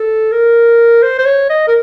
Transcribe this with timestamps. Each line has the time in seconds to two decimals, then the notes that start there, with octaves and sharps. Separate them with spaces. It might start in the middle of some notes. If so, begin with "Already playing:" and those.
Already playing: A4
0.32 A#4
1.02 C5
1.18 C5
1.26 C#5
1.50 D#5
1.68 A#4